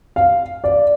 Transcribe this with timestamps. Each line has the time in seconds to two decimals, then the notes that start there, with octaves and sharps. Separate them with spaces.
0.16 F5
0.64 D5